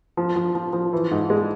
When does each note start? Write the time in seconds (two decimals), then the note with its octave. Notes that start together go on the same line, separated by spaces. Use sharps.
0.17 F3
0.36 F3
0.55 F3
0.73 F3
0.93 E3
1.11 G#2
1.30 G#3